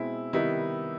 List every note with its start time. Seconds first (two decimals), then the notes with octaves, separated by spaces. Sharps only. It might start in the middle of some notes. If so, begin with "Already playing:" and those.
Already playing: B2 G#3 C4 E4
0.33 C3 D#3 G3 B3 D#4 E4